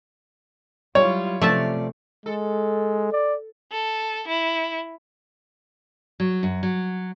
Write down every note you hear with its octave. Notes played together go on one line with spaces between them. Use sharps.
F#3 G3 E4 F4 C#5
C3 F3 A3 C#4 D5 E5 A5
G#3 A4
D5
A4
E4
F#3
F#2
F#3